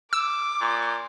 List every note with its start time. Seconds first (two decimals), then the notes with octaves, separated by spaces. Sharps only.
0.13 D6 E6
0.61 A#2